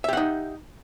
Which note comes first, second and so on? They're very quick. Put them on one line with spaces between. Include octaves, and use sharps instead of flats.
E5 G4 F#5 D#4